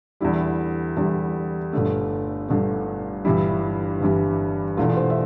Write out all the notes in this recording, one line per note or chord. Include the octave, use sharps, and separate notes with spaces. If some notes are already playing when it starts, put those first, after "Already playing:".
E2 D3 G3 E4
E2 D3 G3
G1 G2 D3 A3
G1 G2 D3 A3
G1 G2 E3 G3 E4
G1 G2 E3 G3
E1 E2 D3 A3 F4
C5
E5